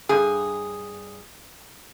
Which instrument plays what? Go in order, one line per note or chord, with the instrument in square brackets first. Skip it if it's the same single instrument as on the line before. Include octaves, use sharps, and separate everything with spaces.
[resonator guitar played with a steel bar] G2 G#4